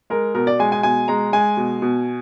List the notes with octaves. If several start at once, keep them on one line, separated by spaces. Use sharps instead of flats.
G#3 A#4
B2 A#4
D5
G#3 G#5
G#5
B2 G#5
G#3 A#5
G#3 G#5
B2
B2